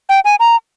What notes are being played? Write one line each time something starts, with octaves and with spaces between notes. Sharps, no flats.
G5
G#5
A#5